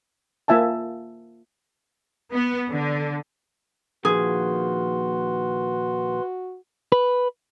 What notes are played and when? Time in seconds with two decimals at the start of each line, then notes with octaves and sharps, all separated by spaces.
0.48 A#3 F4 E5 G#5 A5
2.33 B3
2.70 D3
4.05 A#2 D#3 F3 F#4 G#4 B4 C6
6.92 B4